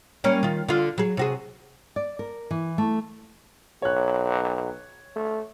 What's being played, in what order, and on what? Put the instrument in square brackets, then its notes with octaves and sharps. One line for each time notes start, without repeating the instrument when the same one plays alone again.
[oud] G3 A#3 C#4
D#3 F4
D3 F4
F#3 G#4
C3 F#4 G#4
[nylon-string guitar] D5
A#4
E3
A3
[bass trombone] B1 [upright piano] C#5 F#6
[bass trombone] A3